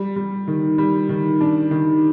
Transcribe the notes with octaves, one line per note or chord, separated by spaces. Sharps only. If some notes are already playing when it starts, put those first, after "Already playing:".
Already playing: G3
G3
D#3
G3
D#3
D4
D#3